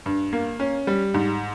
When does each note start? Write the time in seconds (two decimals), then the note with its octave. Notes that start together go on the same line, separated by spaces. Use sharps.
0.06 G2
0.33 A#3
0.60 C#4
0.87 G3
1.14 G#2